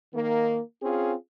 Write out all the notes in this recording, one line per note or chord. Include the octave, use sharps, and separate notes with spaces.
D#3 A#3
C4 C#4 F4 G#4